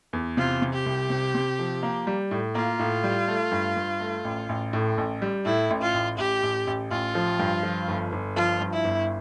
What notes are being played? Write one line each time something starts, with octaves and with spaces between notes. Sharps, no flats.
E2
C3 F4
C3
G4
C2
C3
C3
F3
A#3
G3
A2
A#3 F4
A2
G3
A3
G2
G2
A3
A1
A1
A2
A1
G3
A2 E4
A1
F4
A1
A1 G4
A1
A1
A1 F4
F3
G2
F3
G1
G1
F3 F4
G2
E4
G1